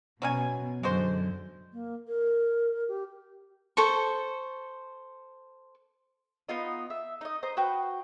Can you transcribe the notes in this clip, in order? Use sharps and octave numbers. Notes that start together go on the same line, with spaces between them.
B2 F#3 C#4 G#5
F#2 D3 G#3 F#4 C5
A#3
A#4
G4
A4 C5 C#6
B3 D#4 F4 D#5
E5
D#4 D#5
C5 D#5 A#5
F#4 B4 G5